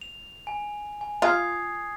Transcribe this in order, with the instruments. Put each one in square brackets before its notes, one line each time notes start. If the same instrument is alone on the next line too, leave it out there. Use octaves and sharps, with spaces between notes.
[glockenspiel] F7
G#5
G#5
[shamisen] F4 [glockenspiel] D#6 G#6 C7